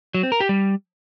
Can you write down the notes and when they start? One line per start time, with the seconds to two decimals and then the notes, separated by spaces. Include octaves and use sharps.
0.14 F#3
0.23 C4
0.32 A#4
0.40 G4
0.49 G3